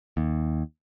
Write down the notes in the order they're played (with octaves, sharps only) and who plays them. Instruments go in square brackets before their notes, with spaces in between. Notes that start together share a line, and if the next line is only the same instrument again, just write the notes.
[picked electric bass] D#2